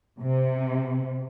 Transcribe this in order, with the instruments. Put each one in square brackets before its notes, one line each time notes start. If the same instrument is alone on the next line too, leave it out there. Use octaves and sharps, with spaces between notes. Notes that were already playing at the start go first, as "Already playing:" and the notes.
[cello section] C3